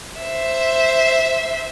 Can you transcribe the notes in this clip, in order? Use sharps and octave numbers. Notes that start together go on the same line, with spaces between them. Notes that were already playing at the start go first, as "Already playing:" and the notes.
C5 E5